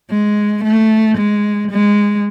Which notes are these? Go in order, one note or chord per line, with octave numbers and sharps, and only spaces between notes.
G#3
A3
G#3
G#3